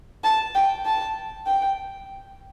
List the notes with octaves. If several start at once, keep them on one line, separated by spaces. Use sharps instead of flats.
A5
G5
A5
G5